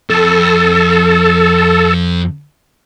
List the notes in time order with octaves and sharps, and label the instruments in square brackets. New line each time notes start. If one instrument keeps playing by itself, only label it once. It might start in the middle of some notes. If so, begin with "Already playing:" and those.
[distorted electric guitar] F2 [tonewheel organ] A4